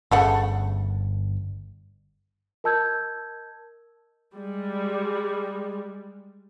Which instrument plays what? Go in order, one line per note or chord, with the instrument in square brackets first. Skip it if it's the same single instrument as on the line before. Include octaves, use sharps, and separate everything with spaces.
[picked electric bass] G1 [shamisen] C#3 A3 F#5
[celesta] A#4 D#5 A5 E6 G6 G#6
[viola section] G3 G#3